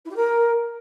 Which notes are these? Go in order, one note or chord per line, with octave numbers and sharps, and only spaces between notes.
E4
G4
A#4